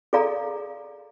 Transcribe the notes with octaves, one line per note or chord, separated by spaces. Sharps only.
G#4 A4 D5 F5 A#5